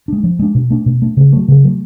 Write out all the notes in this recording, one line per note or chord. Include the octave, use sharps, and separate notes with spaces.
G#3 D4
F3
G#3 D4
B2
A3 D4
B2
A3 D4
C#3
F#3 A3
C#3
F#3 A3